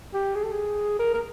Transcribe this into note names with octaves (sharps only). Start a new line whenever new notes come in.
G4
G#4
A4
G#4
A#4
A#4